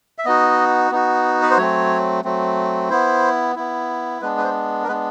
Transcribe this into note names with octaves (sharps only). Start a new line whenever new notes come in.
E5
B3 D#4 F#4 D#5
B3 D#4 F#4
B4
C5
F#3 A3 C4 C#5
F#3 A3 C4
B3 E4 C5
B3 E4
G#3 B3 D4 B4
B4
C5
A#4
G#3 B3 D4 B4